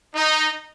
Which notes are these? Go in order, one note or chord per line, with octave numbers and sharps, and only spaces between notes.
D#4